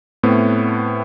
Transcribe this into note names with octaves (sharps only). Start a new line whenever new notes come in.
A2 A3 B3 C4